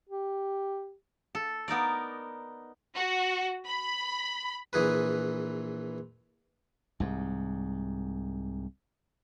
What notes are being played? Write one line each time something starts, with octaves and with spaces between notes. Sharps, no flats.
G4
A4
B3 D#4 A#4 D5
F#4
B5
A#1 E3 G#4 B4
C2 G#2